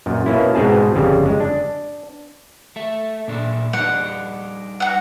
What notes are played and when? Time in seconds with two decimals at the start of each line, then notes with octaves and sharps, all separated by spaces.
0.06 F#2 A#2
0.26 B2 A#3 C#4 E4
0.55 G#2 B2 C4 G#4 A5
0.94 G1 F2 C#3 G3
1.26 G#3
1.40 D4
2.76 A3 E5
3.28 A#2 D4 E5
3.73 G3 D4 D#4 F#5
4.80 F#4 F#5